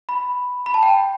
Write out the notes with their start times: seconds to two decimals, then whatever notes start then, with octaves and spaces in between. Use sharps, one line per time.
0.09 B5
0.66 B5
0.74 A5
0.83 G5